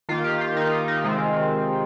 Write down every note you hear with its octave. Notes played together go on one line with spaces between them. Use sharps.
D#3 A#3 F4
G4
F4
D#4
F4
D#4
C3 D#3 G#3 C4 F4